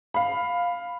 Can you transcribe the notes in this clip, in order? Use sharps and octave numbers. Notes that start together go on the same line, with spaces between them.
F5 B5